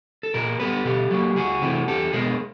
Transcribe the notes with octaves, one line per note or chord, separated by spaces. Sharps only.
A4
A#2 G#4 A#4
G3 B3 A4 B4
B2 G4 A4
F#3 A#3
C#2 F#4 G#4
C3 E3 A3 C4
E2 G4 A4
B2 G#3 B3 G#4 A#4